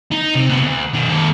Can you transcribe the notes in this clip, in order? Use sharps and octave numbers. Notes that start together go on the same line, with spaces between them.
D#4
C3
C3 B3
D2
B2 D#3
D#2 A4